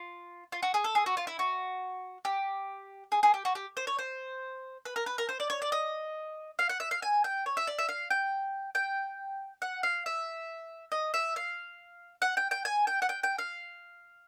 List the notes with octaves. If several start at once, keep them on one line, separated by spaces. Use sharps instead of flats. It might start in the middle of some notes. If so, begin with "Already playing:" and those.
Already playing: F4
F4
F#4
G#4
A4
G#4
F#4
F4
E4
F#4
G4
G#4
G#4
G4
F#4
G4
C5
C#5
C5
B4
A#4
B4
A#4
C5
D5
C#5
D5
D#5
F5
F#5
E5
F5
G#5
G5
C#5
E5
D5
E5
F5
G5
G5
F#5
F5
E5
D#5
E5
F5
F#5
G5
G5
G#5
G5
F#5
G5
G5
F5